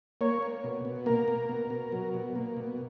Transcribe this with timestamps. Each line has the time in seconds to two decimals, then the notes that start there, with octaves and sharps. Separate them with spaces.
0.21 A#3 C#5
0.42 A#3
0.64 B2
0.85 B2
1.06 A#3 A#4
1.28 A#3
1.49 B2
1.70 B2
1.92 F#3
2.14 B2
2.35 A#3
2.57 B2